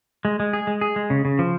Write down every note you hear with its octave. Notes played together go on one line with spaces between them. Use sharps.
G#3
G#3
G#4
G#3
G#4
G#3
C#3
C#3
F3